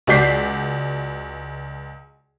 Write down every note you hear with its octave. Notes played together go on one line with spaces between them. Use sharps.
C#2 F#4 D5 G6 B6 C7